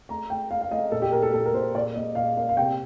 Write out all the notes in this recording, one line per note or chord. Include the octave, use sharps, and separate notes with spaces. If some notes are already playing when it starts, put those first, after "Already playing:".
A3 A#5
A3 G5
A3 F5
F5
A3 D#5
A#2 A4
G4
A#2 A#4
A4
A#2 A4
A#4
A#2 C5
A#2 D5
A#3 D#5
A#2 F5
A#3 F5
F5
C3 G5